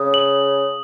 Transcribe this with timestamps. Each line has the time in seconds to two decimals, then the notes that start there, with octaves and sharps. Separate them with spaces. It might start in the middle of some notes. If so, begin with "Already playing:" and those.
Already playing: C#3 D#6
0.14 F#7